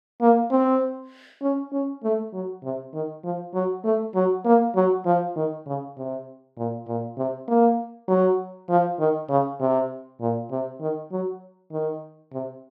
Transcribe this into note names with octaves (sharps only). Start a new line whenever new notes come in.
A#3
C4
C#4
C#4
A3
F#3
C3
D#3
F3
F#3
A3
F#3
A#3
F#3
F3
D#3
C#3
C3
A#2
A#2
C3
A#3
F#3
F3
D#3
C#3
C3
A#2
C3
D#3
F#3
D#3
C3